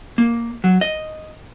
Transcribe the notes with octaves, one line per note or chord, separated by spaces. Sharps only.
A#3
F#3
D#5